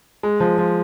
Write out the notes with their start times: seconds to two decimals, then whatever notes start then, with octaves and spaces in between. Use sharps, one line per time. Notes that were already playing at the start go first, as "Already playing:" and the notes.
0.23 G#3
0.40 F3
0.58 F3